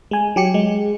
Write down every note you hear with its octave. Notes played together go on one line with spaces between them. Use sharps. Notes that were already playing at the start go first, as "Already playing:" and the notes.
G#3 G#5
F#3 G4 C#7
G#3